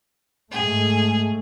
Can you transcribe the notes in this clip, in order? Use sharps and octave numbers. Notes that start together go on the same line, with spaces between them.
G#2 A3 G#4